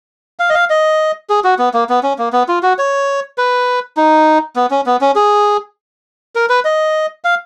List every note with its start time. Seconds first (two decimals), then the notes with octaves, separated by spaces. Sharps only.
0.39 F5
0.50 D#5
0.54 F5
0.70 D#5
1.30 G#4
1.44 F#4
1.59 B3
1.74 A#3
1.89 B3
2.03 C#4
2.18 A#3
2.33 B3
2.48 F4
2.63 F#4
2.79 C#5
3.38 B4
3.97 D#4
4.56 B3
4.71 C#4
4.86 B3
5.01 C#4
5.16 G#4
6.35 A#4
6.49 B4
6.65 D#5
7.24 F5